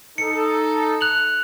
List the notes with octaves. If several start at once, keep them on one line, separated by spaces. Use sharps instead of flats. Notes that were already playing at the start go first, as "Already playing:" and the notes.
D#4 A4 C#7
F#6 F7 F#7